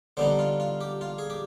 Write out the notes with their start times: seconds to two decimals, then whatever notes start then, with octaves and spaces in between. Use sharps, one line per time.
0.17 D3 G3 B3 D#4 C5
0.39 F4
0.60 F4
0.81 G4
1.01 F4
1.18 G#4
1.30 G4